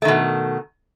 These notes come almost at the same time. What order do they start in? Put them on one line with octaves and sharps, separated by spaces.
A3 D#3 B2